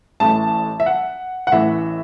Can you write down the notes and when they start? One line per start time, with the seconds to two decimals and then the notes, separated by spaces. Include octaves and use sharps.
0.20 A1 A2 E3 A5
0.80 E5
0.86 F#5
1.47 F#5
1.52 A1 A2 E3 E5